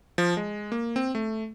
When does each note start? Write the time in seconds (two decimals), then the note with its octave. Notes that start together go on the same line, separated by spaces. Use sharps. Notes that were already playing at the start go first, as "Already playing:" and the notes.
0.18 F3
0.37 G#3
0.72 A#3
0.96 C4
1.15 A3